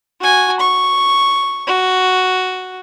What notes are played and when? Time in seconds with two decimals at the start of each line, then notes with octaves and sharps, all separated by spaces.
0.21 F#4 G#5
0.61 C#6
1.67 F#4